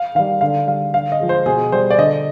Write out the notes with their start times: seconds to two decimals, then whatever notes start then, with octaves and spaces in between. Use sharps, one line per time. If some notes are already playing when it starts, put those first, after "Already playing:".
Already playing: F5
0.15 D#3 G3 F5
0.41 D3 F5
0.67 G3 F5
0.94 D3 F5
1.12 D#5
1.20 F3 G#3
1.29 C5
1.46 B2 G#4
1.72 G3 C5
1.90 D5
1.98 D3 D#5